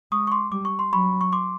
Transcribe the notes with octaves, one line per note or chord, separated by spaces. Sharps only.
G#3 C#6 D#6
C#6
C6 D6
G3 D6
C#6
C6
F#3 B5 C#6
C#6
C6 D6